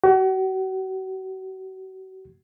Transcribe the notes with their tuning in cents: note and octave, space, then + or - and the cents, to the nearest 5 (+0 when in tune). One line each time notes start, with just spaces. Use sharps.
F#4 +40